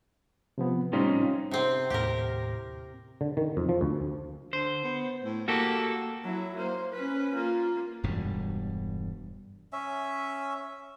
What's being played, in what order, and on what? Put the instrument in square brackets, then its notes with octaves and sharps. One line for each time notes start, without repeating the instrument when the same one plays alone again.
[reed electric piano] C3 F3 B3
[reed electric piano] A2 G3 C4 [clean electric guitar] C#4 D#4 F4
[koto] C3 C4
[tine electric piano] D#2 A2 [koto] G4 A#4
[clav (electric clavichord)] D3
D#3
F2
F3
D2
[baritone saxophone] D3 [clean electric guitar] C5
[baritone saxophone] B3
A2
[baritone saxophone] A#3 [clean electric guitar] F#4 G4 A4
[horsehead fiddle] F#3 E4
A#3 C5
C#4 B4
A#3 F4
[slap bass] E1 G2 B2 G3
[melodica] C#4 E5